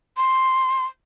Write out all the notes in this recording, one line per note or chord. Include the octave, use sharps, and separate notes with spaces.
C6